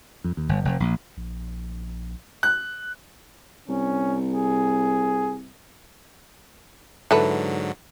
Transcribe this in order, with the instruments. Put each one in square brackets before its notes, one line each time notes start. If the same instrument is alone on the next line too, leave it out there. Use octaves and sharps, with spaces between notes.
[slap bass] F2
D#2
G1
F1
A#1
[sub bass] A#1
[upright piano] F#6
[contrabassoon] C2 [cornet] C#4
[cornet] G#4
[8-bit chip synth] G#2 D3 F#3 [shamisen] E3 A4 B4